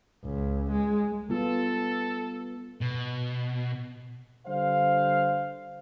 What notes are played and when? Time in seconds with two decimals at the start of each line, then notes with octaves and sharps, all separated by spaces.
0.24 C#2
0.72 G#3
1.29 G3 B3 F4 A4
2.81 B2
4.46 D3 G3 C5 F5